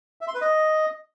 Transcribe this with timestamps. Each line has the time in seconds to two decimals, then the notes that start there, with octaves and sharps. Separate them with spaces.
0.21 E5
0.28 C6
0.34 B4
0.41 D#5